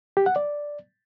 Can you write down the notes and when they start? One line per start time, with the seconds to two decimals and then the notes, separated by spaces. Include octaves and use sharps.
0.17 G4
0.26 F#5
0.36 D5